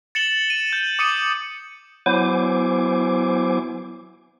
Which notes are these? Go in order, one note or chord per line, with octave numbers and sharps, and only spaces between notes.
A6 C#7 E7 F#7 G7
D#7
G6
D6 D#6 C#7 D#7 F#7
F#3 B3 E4 C5 G#5 D6